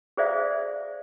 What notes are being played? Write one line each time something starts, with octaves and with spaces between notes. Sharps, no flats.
G#4 A4 C5 D5 E5 F5